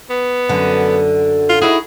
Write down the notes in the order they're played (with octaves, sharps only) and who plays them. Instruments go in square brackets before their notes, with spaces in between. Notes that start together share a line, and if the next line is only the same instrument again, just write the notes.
[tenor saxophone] B3
[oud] F#2 D3
[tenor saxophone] F4
[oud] D#4 E4 F#4 [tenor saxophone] G#4